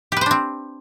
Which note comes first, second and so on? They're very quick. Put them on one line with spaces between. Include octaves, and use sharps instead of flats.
G4 B4 C5 D4 C4